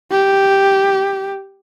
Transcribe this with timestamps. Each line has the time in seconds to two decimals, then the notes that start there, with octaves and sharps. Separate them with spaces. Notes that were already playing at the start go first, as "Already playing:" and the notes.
0.11 G4